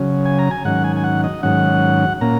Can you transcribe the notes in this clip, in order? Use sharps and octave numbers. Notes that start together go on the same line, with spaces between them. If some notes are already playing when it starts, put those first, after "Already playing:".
Already playing: C#3 F#3 C#4
G#5
A#5
G#5
G#2 D#3 F#3 C#4 F#5
G#5
G#5
F#5
D#5
G#2 D#3 F#3 C#4 F#5
A#2 A#3 C#4 A#5